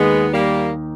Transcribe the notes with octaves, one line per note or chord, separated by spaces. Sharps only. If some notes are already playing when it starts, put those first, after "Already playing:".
Already playing: D#2 D#3 G#3 A#3 B3 D#4
G3 A#3